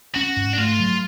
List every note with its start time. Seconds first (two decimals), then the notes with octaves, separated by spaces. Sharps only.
0.15 C#4 F#4
0.37 G#2
0.53 D4
0.58 A3 F4
0.80 F#3